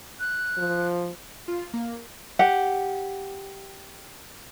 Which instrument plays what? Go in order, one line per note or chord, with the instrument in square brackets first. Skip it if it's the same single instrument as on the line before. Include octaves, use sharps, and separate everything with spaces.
[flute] F#6
[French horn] F3
[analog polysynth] F4
A#3
[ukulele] G4 F#5